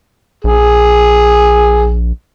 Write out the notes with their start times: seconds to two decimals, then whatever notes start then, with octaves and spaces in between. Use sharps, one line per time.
0.44 A#1 G#4